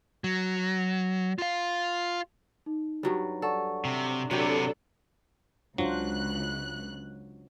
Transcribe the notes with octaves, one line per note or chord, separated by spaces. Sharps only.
F#3
F4 F5
D#4
G2 F#3 G3
A4 D5 F#5 C#6
C3
C3 F#3 B3 D4 G4 A4 D#7
C#2 F#3 D4 F4 C5 F#6